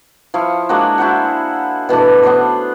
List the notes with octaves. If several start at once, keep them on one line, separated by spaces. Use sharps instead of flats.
F3 E4 F5 C#6
G#3 A#3 D4 F#4
E4 F#4 C5 F#5
G#4
B2 E3 A3 D4
B3 D4 C5 C#5